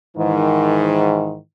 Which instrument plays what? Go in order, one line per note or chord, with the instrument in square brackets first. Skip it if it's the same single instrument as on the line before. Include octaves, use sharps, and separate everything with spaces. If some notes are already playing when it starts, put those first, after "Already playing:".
[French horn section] G#2 D#3 E3